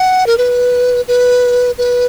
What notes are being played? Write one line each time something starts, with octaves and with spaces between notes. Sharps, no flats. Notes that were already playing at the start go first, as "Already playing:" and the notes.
Already playing: F#5
A#4
B4
B4
B4